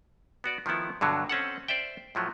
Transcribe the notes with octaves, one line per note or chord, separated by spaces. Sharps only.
B3 F#4 D5
D#3 F3 A3 B3 E4
G2 B2 D3 F#3
C4 C#4 A4 F#5
C5 D5 E5 G5
A2 F3 F#3 A3